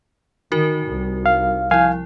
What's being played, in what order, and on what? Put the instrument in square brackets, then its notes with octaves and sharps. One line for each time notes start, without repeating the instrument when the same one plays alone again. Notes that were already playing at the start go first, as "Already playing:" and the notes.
[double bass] D#3 [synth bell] D#4 F#4 A#4
[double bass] C2
[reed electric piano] F5
[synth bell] F3 E4 [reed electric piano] F5 G#5